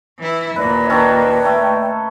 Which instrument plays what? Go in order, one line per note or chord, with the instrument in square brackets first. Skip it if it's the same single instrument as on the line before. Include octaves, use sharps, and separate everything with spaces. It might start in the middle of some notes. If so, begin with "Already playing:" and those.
[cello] E3 E4
[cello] D#2 A#2 [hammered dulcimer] B4 [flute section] D5 D#5
[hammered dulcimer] D#3 C#4 A4 [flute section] B4 D5 G5
[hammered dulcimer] A3